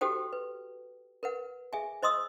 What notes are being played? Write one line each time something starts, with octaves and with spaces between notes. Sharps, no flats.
F#4 G4 A4 C5 G5
B4
A#4 B4 F#5
G#4 E5 G#5
C5 D#5 C6 D#6 E6